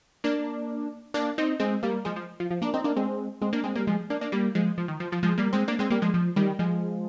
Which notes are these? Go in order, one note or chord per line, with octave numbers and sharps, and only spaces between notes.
A#3 D4
A#3 D4
C4 D#4
G#3 C4
G3 A#3
F3 G#3
F3
F3
F3
A#3 D4
C4 D#4
A#3 D4
G#3 C4
G#3 C4
A#3 D4
G#3 C4
G3 A#3
F3 G#3
A#3 D4
A#3 D4
G3 A#3
F3 G#3
F3
D#3
F3
F3
F3 G#3
G3 A#3
G#3 C4
A#3 D4
G#3 C4
G3 A#3
F3 G#3
F3
D#3 G3
F3 G#3